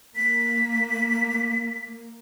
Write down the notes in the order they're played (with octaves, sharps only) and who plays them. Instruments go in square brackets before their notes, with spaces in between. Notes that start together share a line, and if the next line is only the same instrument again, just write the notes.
[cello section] A#3 [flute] B6